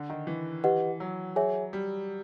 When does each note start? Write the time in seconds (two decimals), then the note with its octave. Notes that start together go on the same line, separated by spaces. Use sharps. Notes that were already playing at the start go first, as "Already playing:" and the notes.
Already playing: D3
0.10 D#3
0.27 E3
0.64 G4 B4 D#5 F#5
1.00 F#3
1.36 G#4 C#5 E5 G#5
1.73 G3